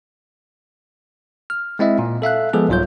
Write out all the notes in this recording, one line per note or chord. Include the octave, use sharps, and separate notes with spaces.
F6
G#3 C4 E4 D#5 E5
A#2
A4 E5 F5 F#6
F3 G#3 B3 G#4 A4
C2 G#2 F#3 F4 C#5 G6